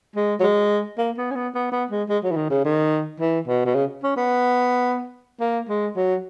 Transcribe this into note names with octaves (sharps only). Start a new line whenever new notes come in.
G#3
F#3
G#3
A#3
B3
C#4
B3
B3
B3
G#3
G#3
F#3
E3
D#3
C#3
D#3
E3
B2
B2
C#3
C#4
B3
A#3
G#3
F#3